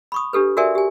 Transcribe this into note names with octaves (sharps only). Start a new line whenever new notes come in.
B5 C#6 D#6
D4 G4 A4 B4
F#4 A4 A#4 D5 E5 G#5
G4 G#5